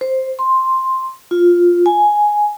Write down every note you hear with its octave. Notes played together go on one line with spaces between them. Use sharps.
C5
C6
F4
G#5